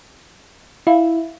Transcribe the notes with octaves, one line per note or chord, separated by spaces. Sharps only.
E4 F5